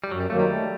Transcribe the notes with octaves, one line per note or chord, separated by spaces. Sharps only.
G3
F#2 F#3
G3
D#3 F#3 A3 A#3
G3
A3